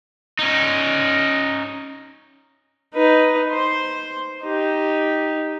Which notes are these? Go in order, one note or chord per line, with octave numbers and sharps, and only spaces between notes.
C#4 D#4
D#4 B4
C5 C6
D#4 G4